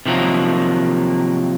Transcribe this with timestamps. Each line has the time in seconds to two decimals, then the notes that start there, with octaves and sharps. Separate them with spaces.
0.06 C3 D#3 F3 F#3 A#3